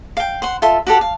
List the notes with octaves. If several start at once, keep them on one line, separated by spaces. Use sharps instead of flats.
F5 G5
C5 F#5 C6
F4 A4 E5 C6
F#4 G4 A4 F#5
F5